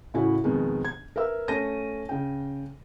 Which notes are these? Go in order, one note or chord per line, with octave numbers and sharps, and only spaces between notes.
A2 C#3 E4 F#4 G#5
F2 B2 D#3 G#3
G#6
A#4 B4 E5 E6
A3 C#4 A5 A#6 D#7
C#3 G5